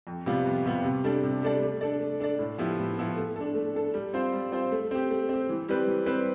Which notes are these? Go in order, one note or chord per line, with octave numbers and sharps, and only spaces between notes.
F2
C3 G3 B3 F4
F2
C3 G3 B3 F4
C3
G3 D4 A4 D5
C3
G3 D4 A4 D5
A3
D4 A4 D5
A3
D4 A4 D5
A2
F3 B3 E4 G4
A2
F3 B3 E4 G4
A3
D4 A4
A3
D4 A4
G3
C4 F4 C5
G3
C4 F4 C5
A3
C4 G4
A3
C4 G4
E3
G3 C4 G4 B4
E3
G3 C4 G4 B4